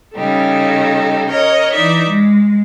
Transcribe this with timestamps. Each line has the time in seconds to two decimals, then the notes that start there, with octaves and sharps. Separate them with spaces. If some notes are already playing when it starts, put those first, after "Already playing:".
0.15 C#3 G3 D#4 A4
1.28 A#4 C#5 D#5
1.73 E3 D#4 D5 E5
2.07 G#3